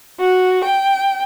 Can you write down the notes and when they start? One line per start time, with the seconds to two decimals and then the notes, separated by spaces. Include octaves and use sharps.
0.20 F#4
0.65 G5